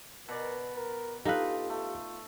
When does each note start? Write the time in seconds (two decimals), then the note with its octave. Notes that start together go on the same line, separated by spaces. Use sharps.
0.28 B2 A#4 D5
0.75 A#4
1.25 D#4 F4 G4 A4 B4 F5
1.69 A3